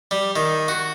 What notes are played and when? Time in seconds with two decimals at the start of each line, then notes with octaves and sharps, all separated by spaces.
0.11 G3
0.36 D#3
0.68 F#4